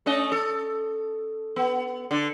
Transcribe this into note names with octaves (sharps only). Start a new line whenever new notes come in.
A3 C#4 D#5
A4
B3
D3